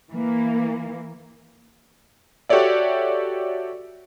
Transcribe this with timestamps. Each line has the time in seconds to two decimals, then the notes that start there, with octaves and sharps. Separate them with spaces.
0.10 E3 A#3
2.49 F#4 G4 A4 C#5 D5 E5